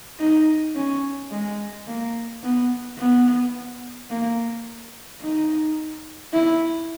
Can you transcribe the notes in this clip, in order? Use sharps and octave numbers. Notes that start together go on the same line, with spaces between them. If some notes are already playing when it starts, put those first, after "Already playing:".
D#4
C#4
G#3
A#3
B3
B3
A#3
D#4
E4